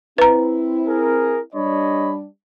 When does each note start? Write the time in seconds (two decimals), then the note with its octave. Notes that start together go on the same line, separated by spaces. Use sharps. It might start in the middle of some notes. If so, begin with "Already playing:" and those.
0.18 C4 E4 B4 A#5
0.88 G#4 A#4
1.55 G3 D4 C#5 D#5 B5